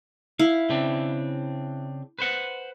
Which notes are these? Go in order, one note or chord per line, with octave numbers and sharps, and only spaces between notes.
E4 F5
C#3 C4 D4
B4 C5 F#5